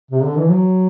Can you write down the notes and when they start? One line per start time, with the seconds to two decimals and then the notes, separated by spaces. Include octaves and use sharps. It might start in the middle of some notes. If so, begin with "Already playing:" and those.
0.11 C3
0.24 D3
0.37 E3
0.50 F#3